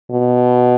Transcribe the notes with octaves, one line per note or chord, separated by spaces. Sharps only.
B2